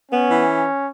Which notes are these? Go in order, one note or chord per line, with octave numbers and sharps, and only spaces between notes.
B3 C#4
E3